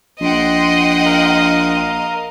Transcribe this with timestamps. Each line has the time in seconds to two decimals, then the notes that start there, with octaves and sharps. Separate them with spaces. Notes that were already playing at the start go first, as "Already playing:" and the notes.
0.21 A#1 D#5 F#5 G5 C6
1.06 A#4 F5